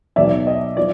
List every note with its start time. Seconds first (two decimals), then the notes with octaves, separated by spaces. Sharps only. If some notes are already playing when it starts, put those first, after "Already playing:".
0.16 B1 B2 F#3 D5 E5
0.47 D#5
0.77 F3 D5